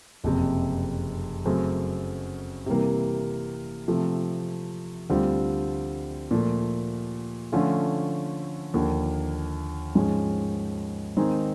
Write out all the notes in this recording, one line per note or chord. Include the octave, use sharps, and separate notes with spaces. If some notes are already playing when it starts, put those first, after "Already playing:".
F#1 F2 C3
F#2 C#3 F#3 A3 C4
C3 E3 G3 A#3
C3 F3 A3
D2 D3 G3 C4 F4
A#2 F3 A3
D3 F3 A3 C#4 F4
D#2 D3 F3 A#3
G#2 F3 G#3 C#4
D#3 G#3 C4 D#4 G#4